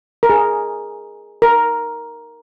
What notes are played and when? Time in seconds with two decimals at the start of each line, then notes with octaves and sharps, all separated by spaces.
0.23 A#4
0.29 G#4
1.42 A#4